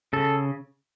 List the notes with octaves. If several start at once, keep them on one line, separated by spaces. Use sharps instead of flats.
C#3 A4